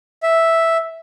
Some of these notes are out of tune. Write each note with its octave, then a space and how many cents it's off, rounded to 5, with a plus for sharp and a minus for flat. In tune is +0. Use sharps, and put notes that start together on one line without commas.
E5 -5